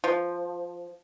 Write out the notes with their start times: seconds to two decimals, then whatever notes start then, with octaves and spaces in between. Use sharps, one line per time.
0.04 F3